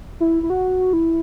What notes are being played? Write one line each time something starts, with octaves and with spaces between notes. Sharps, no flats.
E4
E4
F#4
E4